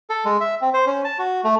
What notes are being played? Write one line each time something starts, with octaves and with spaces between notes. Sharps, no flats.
A4
G#3
E5
C4
C5
C#4
A5
F#4
A3